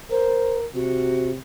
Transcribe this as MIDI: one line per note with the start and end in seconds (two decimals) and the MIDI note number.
0.11 0.66 70
0.11 0.58 72
0.74 1.37 48
0.74 1.30 66